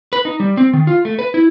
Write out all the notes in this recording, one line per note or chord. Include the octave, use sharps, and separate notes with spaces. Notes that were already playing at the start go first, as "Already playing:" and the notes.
B4
D#4
G3
C4
D#3
F4
A3
B4
E4